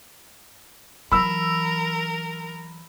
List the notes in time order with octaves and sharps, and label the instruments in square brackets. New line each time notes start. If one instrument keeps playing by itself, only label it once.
[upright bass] E3 F#3 [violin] A#4 [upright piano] B5 E6